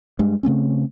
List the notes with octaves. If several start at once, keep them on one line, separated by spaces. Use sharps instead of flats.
G2 G#3
C#3 A3 C4 C#4